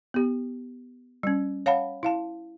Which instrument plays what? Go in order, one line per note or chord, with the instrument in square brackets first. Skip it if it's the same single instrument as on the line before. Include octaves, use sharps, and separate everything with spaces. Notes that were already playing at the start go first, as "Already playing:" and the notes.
[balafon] B3 G4
G3 C#4
C#5 F5 F#5 A5 B5
E4 F5 A5